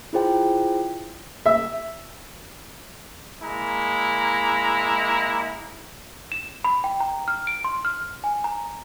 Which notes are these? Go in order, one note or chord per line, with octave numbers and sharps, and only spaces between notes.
E4 F4 G#4 C5 G5
E5
G#3 A#3 E4 A#5
E7
B5
G5
A#5
F6
D7
C6
F6
G#5
A#5